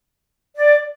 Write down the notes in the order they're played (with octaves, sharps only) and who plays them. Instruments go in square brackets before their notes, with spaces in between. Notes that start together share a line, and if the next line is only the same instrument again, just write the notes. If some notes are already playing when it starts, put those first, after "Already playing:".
[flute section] D5